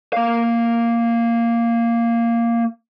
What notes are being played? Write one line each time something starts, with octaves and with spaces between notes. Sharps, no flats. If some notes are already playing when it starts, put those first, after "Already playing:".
A#3 F5